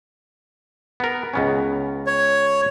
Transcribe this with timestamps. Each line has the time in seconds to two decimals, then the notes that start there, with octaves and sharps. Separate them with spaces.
1.00 B3 A#4
1.33 C#2 B3 C#4
2.07 C#5